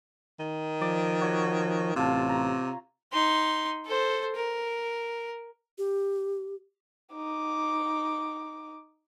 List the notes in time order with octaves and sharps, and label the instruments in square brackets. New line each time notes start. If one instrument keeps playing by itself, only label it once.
[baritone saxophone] D#3
[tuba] F3 [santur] D5
[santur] F#4 C#5 F#5
[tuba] A1 [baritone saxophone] C3 [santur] F4 A5
[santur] A#5
[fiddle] D#4 C6
A4 C5
A#4
[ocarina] G4
[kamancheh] D#4 D6